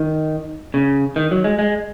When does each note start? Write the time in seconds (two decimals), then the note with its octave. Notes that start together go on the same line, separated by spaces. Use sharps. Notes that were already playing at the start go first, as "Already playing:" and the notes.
Already playing: D#3
0.74 C#3
1.16 D#3
1.31 F#3
1.44 G#3
1.59 G#3